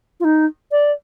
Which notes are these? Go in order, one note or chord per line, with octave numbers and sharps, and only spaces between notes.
F4
D#4
D5